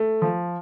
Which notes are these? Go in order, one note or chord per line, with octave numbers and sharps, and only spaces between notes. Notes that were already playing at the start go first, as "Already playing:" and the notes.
Already playing: A3
F3